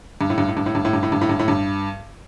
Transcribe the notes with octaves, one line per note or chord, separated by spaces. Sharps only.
G2
A2
G2
A2
G2
A2
G2
A2
G2
A2
G2
A2
G2
A2
G2